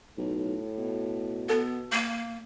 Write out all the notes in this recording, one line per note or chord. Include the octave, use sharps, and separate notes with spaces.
B1 A2
B2
B3 A4 B4 A5
A#3